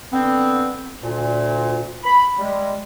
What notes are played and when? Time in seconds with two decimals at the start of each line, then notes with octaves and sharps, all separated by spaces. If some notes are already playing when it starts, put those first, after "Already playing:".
0.13 D3 B3 C4
1.03 D2 A#2
2.04 B5
2.39 G3 G#3